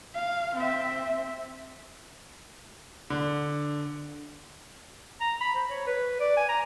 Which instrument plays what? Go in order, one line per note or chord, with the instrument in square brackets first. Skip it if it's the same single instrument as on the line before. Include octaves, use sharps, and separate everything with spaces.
[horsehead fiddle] F5
C4 E5
[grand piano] D3
[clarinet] A#5
B5
C5
C#5
B4
D5
G#5
A#5